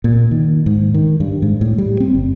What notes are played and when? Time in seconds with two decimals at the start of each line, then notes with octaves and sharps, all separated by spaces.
0.04 A#2
0.31 D#3
0.66 G#2
0.94 D#3
1.20 G2
1.42 G#2
1.61 A2
1.78 G3
2.00 C4
2.14 F#1